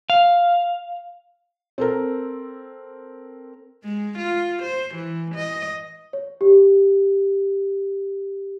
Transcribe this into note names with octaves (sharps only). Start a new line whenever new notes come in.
F5
C4 A4 A#4
G#3
F4
C5
E3
D#5
C#5
G4